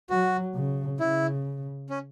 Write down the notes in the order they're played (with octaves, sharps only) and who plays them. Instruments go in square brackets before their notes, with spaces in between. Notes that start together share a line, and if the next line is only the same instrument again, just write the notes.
[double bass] F#3 [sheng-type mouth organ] F#4
[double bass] C#3
[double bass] C#3 [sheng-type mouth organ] E4
[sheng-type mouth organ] C#4